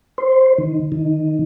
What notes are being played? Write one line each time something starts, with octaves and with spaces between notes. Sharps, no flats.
C5
D#3
D#3